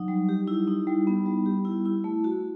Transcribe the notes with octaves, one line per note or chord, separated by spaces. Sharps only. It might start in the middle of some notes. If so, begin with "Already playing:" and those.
Already playing: F#3 D#4
G3
G4
E4
D#4
G3
B3
G3
G4
E4
E4
A3
F#4